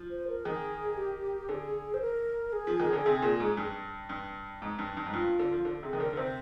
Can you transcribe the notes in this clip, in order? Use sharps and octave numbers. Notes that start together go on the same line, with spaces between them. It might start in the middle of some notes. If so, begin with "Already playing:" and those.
Already playing: F3
C5
A#4
D#3 G#4
G4
D3 G#4
C5
A#4
G#4
F3
D#3
D3
C3
A#2
G#2
G2
G2
G#2
G2
G2
G#2
G2 F4
D3
F3
D3
C3 G#4
D#3
D3 A#4
D3
C3 C5